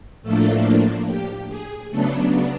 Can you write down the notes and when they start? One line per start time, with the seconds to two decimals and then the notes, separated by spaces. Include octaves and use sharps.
0.23 A2 F3 A3 A#3 D4 A4
1.08 G4
1.49 G#4
1.91 C#3 F#3 A3 B3 D4 A4